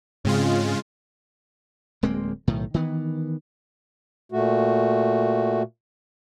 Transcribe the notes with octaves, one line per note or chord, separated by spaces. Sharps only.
G#2 C#3 G#3 C4 F4
D1 G#3 A#3 C4
B1 A2 D#3
D#3 E3 B3
A#2 A3 F#4